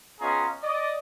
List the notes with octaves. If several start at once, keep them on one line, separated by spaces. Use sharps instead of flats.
B3 C#4 F4 G#4 D#5 A#5
D5 D#5